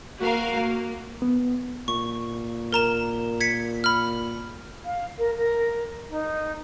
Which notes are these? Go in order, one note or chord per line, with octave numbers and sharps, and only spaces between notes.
A#3 F#4 A#4 F5
A#3
B3
A#2 C#6
A#4 A#5 E7
G#6 B6 C#7
B5 F6
F5
A#4
A#4
D#4